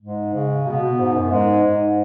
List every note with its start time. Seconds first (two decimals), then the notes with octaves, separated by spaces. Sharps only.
0.01 G#2 G#3
0.34 C#3
0.67 B2 B3
0.82 B2
0.99 G#2
1.15 F#2
1.31 G#2 G#3
1.63 G#2